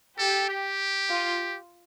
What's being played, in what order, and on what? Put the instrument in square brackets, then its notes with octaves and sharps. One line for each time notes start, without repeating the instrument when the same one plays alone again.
[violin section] G4 [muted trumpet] A4
[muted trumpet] G4
[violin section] F4